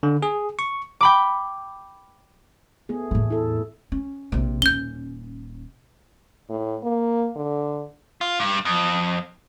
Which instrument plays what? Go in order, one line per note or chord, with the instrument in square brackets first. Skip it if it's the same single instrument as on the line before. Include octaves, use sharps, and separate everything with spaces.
[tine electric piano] D3
G#4
C#6
[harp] G5 B5 D6
[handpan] A3 B3 G#4
[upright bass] E2 A2
[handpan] E4 A4
[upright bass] C#4
A#1 C3
[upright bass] D#1 C#4 [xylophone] G6 G7
[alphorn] A2
A#3
D3
[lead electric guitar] F4
G2
F2